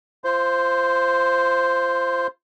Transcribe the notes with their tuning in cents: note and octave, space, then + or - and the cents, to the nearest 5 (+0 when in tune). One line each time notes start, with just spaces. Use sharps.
F4 -30 C5 +0